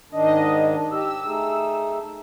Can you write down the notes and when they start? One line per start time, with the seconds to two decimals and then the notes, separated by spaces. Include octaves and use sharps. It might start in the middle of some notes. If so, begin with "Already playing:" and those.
0.12 G#2 D#3 D4 D#5
0.91 G4 E6
1.25 A3 D#4 G#4